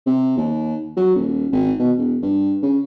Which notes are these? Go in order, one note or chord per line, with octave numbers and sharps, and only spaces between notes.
C3
D#2
F#3
D#1
G#1
B2
E1
G2
C#3